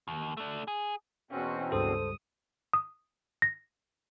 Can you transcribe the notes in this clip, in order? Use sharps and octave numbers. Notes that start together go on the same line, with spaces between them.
D#2
A3 D4
G#4
E2 B2 C4 C#4 F#4
C#2 G2 A4 C5 D#6
D#6
A#6